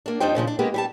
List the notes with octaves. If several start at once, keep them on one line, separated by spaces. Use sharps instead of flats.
A#3 D4
F2 G3 D4 D#4 C5 G5
A#2 C#3 F3 D4
D4
G#3 A#3 B3 G4
G3 G4 A5